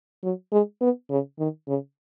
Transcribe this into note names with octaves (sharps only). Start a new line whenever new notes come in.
F#3
G#3
B3
C#3
D#3
C#3